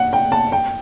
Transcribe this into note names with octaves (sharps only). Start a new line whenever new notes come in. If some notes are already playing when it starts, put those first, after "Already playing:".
Already playing: F#5
G5
A5
G5